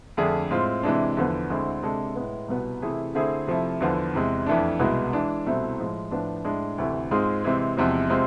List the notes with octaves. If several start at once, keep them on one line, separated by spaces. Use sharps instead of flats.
F2 D3 A3 D4 G#4
A2 G#3 C4 F4
C3 E3 G#3 D4
E2 D3 F3 B3
D2 D3 G#3 C4 E4
C3 G#3 D4 A4
A2 G#3 B3
C2 B2 B3
C3 E3 A3 E4 G#4
D3 A3 C4 E4 G#4
C3 F3 A3 E4
E2 D3 F3 B3
E2 C3 G#3
F2 E3 A3 D4
C2 B2 G#3 B3 E4
E3 G#3 D4
C2 B2 A3 C4 E4
A2 F3 G#3
A2 F3 B3 D4
A2 G#3 D4
D2 C3 E3 A3 E4
G#2 G#3 C4 F4 G#4
C3 E3 G#3 C4
E2 C3 F3 G#3
C3 G#3 C4 F4